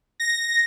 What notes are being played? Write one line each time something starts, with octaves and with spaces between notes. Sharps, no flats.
A#6